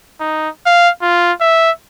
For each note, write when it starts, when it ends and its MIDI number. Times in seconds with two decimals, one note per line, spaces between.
0.20 0.49 63
0.66 0.89 77
1.02 1.33 65
1.41 1.71 76